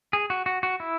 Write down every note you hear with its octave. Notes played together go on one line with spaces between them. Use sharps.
G#4
F#4
F#4
F#4
E4